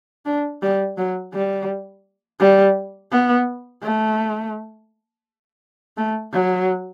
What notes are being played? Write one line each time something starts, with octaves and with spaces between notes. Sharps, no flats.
D4
G3
F#3
G3
G3
B3
A3
A3
F#3